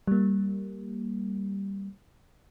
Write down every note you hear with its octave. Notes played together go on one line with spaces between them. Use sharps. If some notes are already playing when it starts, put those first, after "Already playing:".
G3 A#3